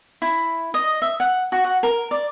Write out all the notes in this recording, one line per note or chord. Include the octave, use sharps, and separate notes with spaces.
E4
D#5
E5
F#5
F#4
F#5
A#4
D5